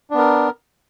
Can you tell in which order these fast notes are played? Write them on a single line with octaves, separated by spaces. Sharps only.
D4 B3 A#4